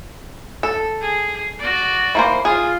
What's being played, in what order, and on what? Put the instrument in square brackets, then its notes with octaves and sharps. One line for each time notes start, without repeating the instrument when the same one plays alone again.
[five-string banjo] A4
[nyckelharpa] G#4
F#4 D5
[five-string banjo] E3 A#3 C5
[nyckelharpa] F4 [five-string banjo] G#4